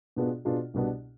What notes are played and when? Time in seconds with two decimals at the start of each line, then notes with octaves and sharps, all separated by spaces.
0.16 B2 B3 D4 F4 G#4
0.45 B2 B3 D4 F4 G#4
0.74 C2 B2 B3 D4